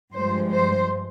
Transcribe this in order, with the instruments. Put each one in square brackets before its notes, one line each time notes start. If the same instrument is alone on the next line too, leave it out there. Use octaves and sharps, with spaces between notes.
[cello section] G2 F3 G#3 C5
C5